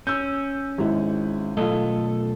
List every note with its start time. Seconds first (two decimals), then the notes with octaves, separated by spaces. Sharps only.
0.07 C#4 E6 G6
0.78 G#1 G#3 E4
1.57 B1 A3 F4 A4 D#5